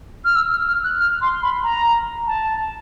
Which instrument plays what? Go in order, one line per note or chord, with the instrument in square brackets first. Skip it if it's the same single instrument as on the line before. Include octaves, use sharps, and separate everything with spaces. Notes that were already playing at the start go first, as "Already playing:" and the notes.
[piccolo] F6
E6
F6
F6
F#6
F6
C6
B5
A#5
A5